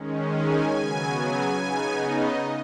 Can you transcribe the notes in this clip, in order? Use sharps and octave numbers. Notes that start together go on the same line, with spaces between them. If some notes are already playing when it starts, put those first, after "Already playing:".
Already playing: D#3 G#3 C#4
G#5
C#3 F#3 B3
G#5
C#3 B3 D#4
D#5